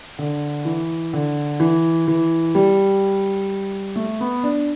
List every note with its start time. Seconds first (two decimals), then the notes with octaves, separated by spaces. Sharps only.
0.19 D3
0.65 E3
1.13 D3
1.60 E3
2.08 E3
2.55 G3
3.96 A3
4.20 B3
4.43 D4